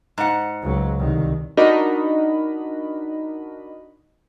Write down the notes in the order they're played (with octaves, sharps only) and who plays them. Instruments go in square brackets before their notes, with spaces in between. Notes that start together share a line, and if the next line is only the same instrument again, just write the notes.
[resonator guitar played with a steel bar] G#2 F#5
[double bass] C#2 F#3
C2 D#3
[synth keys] D4 D#4 F#4 A#4 D#5 B5